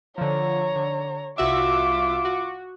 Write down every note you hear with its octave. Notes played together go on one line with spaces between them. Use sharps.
D3 F3 C#5 A#5
D3
C2 F4 F#4 E5 D6
F#4